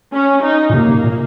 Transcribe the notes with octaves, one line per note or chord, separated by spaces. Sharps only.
C#4
D#4
A#2
C3 A#3
C3
A#2